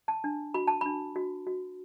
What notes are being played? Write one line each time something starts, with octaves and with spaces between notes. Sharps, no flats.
A5
D4
F#4 B5
A5
D4 B5
F#4
F#4